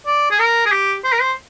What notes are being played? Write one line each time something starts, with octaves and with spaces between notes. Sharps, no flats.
D5
G#4
A#4
G#4
G4
C5
A#4
C5